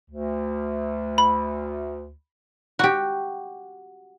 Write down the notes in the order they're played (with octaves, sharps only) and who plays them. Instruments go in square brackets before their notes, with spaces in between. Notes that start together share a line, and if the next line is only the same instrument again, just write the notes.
[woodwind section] D2
[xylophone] B5
[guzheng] F#4 G4